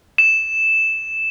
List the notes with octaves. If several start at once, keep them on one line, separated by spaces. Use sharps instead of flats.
E7